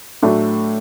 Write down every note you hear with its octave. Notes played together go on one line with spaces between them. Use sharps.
A2 F#3 A3 D4